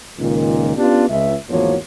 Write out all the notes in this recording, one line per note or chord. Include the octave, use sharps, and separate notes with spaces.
C#2 A#2 D#3
B3 C#4 D4 F4 G4
C#2 E5
G#1 E2 F3 A#3 F#4 C#5